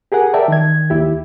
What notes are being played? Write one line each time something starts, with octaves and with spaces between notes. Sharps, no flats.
G4 G#4 A#4 F#5 G#5
A#4 D5 E5 G5 A5
D#3 G#6
D#2 E4 G4